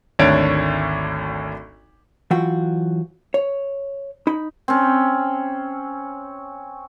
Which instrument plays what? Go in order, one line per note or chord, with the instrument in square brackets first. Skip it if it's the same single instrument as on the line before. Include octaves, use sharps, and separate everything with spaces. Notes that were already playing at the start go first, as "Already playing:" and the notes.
[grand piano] G#1 D2 D4 C#5 D7
[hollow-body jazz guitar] E3 F#3 F4 F#4 G5
C#5
D#4 B5
[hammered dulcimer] C4 C#4